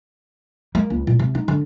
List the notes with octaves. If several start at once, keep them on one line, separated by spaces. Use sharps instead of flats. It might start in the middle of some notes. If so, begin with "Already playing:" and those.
A#3
C#2
A#2
C3
D#4
D3